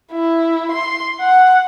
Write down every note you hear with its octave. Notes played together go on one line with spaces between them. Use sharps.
E4
C6
F#5